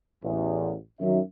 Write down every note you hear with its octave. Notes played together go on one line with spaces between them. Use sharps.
A1 E2
F#2 D#3 E5